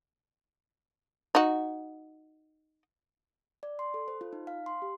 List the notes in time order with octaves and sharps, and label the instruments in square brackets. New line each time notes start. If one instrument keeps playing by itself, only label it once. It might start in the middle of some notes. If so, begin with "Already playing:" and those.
[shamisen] D#4 F#4
[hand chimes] D5
C6
A4
C5
F4
D#4
F5
C6
G4